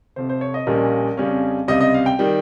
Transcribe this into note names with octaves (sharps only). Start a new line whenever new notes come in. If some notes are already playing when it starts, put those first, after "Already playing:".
F1 F2 C3 C5
C5
C#5
D#5
A#1 A#2 G3 A#3 C#4
F2 C#3 G3 C#4
C#2 C3 G3 D#5
D#5
F5
G5
D#3 G3